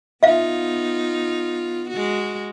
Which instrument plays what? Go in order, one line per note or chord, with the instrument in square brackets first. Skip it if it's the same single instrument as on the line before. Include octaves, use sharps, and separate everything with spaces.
[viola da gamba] B3 D#4 F4 [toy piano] E5 F5
[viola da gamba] G#3 F#4